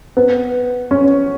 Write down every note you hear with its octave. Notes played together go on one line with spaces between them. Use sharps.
B3
C#4